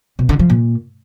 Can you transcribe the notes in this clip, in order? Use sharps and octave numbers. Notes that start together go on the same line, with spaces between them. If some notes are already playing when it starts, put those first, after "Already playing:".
B2
D3
F3
A#2